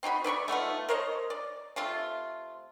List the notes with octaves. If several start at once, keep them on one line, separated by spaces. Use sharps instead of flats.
C4 D#4 F#4 B5
B4 D5 B5 C#6
A3 B3 D#4 F4
A#4 C5 C#5 D#5
D5
C3 A3 F4